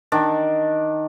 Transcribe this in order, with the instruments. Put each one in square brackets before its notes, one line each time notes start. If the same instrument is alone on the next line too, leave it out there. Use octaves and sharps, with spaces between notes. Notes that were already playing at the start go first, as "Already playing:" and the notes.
[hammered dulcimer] D#3 D4